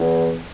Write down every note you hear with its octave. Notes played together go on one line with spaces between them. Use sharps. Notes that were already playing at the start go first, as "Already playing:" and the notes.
Already playing: E2